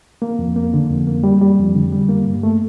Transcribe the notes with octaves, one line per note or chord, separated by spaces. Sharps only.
A#3
F2
A#3
D3
F2
A#3
G3
G3
F2
D3
G3
A#3
G2
A3